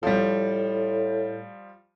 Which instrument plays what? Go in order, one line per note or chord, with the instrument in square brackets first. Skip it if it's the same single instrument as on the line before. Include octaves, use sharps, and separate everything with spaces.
[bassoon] A2 [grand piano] F3 G3